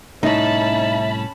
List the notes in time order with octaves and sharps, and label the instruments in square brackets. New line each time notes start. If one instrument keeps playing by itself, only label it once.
[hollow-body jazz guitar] C2 A2 [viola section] C#4 A5 B5 [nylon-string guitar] D#4 [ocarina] E5